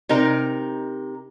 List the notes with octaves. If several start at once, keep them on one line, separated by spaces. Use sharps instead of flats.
C3 D#4 A#4